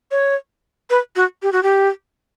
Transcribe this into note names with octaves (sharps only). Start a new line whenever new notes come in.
C#5
B4
F#4
G4
F#4
G4